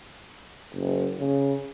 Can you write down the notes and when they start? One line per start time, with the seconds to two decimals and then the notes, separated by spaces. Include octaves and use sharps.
0.75 F#1
1.19 C#3